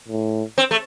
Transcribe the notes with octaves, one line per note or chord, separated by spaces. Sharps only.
A2
C4
A3